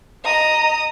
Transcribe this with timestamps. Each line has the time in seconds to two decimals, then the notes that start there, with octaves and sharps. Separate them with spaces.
0.25 D#5 A#5 D#6